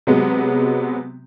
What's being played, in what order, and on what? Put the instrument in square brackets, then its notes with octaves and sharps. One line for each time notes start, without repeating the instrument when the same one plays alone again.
[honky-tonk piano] C3 F#3 G#3 B3